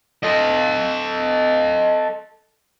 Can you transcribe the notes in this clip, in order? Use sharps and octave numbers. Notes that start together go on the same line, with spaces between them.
A4 D#5